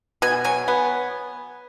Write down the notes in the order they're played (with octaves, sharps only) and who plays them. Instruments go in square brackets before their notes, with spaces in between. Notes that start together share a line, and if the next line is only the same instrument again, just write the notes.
[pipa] B2 [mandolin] G#5
[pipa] F#3 [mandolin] G#5
[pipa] B3